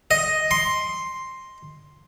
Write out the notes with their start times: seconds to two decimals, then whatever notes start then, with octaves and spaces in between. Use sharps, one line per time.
0.11 D#5
0.51 C6